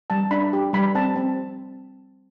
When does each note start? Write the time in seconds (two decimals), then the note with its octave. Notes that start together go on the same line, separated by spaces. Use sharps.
0.10 G3 A5
0.31 D4 B5
0.53 G4
0.73 G3 B5
0.95 C4 A5
1.16 C4